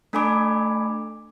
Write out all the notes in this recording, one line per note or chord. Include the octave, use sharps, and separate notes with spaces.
A3 D4 A4 G#5 B5 D6